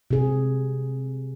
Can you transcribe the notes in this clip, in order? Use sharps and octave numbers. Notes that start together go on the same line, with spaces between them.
C3 G#4